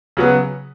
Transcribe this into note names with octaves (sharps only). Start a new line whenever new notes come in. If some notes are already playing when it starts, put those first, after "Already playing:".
C#3 F#3 B3